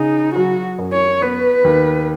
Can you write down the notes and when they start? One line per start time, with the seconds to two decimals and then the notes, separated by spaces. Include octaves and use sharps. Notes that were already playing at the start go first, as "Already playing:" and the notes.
Already playing: C#3 D#4 G#4
0.35 F#3 F#4
0.78 F#2
0.93 C#5
1.22 B3 B4
1.64 D#2